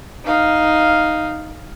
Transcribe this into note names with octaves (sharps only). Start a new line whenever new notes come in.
D#4 F5